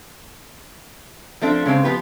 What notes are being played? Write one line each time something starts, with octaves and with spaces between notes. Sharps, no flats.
F3 A3 C4 D4
C#3 G#3 C4
F3 B3 G4 B4